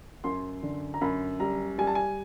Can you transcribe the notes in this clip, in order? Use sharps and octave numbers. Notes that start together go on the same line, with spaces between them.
F#2 C6
D3
A#5
F#2 B5
G3 A#5
G3 G#5
A5
G#5